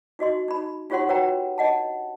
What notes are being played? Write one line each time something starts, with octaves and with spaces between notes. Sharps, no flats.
D#4 F#4 D#5 C6
D#4 B5
D#4 F4 G4 C#5 F#5 C6
F#4 B4 C#5 F#5 G5 A#5
D4 D#5 F#5 A5